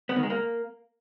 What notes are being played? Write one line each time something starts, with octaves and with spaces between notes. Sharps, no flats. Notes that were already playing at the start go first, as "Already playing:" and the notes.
B3
D#3
G#3
A#3